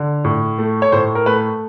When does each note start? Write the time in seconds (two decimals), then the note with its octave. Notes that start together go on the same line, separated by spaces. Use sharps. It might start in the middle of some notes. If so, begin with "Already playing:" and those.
Already playing: D3
0.25 A2
0.59 A3
0.82 C#5
0.92 A2 C5
1.15 A#4
1.26 A3 B4